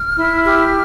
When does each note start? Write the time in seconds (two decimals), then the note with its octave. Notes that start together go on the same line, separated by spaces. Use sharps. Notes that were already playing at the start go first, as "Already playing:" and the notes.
Already playing: F6
0.17 E4
0.44 G4 F6